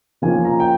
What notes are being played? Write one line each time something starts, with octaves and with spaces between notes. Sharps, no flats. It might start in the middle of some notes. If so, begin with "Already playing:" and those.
C#3 F3 A#3 C#4 G#5
A#5
G5